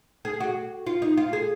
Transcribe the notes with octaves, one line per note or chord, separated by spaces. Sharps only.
G#4
F#4
F4
D#4
F4
G#4